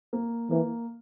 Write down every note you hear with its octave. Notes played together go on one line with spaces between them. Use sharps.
A#3
E3 A#3